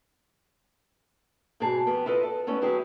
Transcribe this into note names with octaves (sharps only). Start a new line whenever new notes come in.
G#2 B2 G4 G#4 A5
F2 B3 G5
E4 F4 A4 B4 D#5
A4
A3 B3 C#4 E4
D3 F#3 E4 G4 G#4